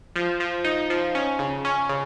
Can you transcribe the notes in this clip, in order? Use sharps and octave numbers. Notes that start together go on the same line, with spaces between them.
F3
F3
D#4
F3
C#4
C#3
C#4
C#3